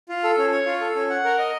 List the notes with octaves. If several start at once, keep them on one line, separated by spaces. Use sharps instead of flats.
F4
A4
C#4
C#5
F4
A4
C#4
F#5
A#4
D#5